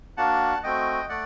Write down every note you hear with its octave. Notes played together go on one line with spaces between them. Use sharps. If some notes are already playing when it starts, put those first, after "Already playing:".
A#3 D4 F#4 F#5 A5
A3 C4 F#4 D#5 G5
A3 D5 F#5